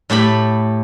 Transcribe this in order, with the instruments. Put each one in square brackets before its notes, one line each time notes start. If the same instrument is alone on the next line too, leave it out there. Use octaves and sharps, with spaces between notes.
[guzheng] A2 A3 G4 B5